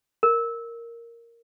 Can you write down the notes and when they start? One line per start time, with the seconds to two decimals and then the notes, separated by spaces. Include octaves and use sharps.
0.23 A#4